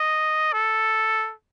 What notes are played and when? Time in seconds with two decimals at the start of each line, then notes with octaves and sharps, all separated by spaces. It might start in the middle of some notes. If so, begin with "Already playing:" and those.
Already playing: D#5
0.53 A4